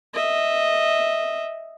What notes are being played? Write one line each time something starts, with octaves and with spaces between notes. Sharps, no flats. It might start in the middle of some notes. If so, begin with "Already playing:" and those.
D#5 E5